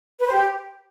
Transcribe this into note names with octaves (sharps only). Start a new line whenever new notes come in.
B4
C5
G4